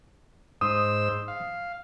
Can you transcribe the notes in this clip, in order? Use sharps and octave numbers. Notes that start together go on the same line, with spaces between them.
G#2 C5 D#6 E6
F5